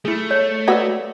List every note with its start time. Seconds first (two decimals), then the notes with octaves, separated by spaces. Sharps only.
0.05 A3 E4 G#4
0.31 C#5
0.68 A#3 F#4 B4 D5 E6 G#6